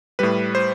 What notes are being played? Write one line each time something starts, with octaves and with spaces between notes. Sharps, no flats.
A2 G3 B4
C5